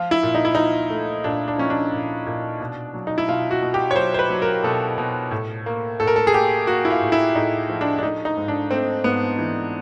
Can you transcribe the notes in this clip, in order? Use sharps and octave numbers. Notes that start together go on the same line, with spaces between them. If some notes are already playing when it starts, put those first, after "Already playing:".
Already playing: F3 F4
E4
A#2
D#4
E4
F3 D#4
A3
A#2 D4
D4
F3 C#4
D4
A#2
A#2
B2
F#3
D#4
E4
B2 F4
F#4
B2
G4
C#5
F#3 C5
C5
B4
F#3
A#4
B2 A4
B2
A2
A#3
A2 A4
A#4
A4
G#4
A#3 G4
A#3 F#4
E4
F4
A2
E4
A2 D#4
F3
D4
D4
A3 D#4
D#4
G#2
D4
A3 C4
G#2 B3
E3